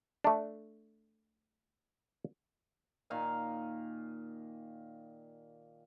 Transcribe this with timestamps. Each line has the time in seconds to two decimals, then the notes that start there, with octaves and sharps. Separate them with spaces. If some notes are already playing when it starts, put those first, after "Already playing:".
0.24 A3 D4
3.10 A#2 D#3 F5 G#5